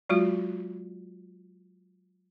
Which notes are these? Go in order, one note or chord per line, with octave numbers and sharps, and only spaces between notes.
F#3 G#3 F4 F#4